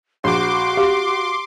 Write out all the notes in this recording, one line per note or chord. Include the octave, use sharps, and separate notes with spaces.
A#1 F#4 C6 D6
G4 F5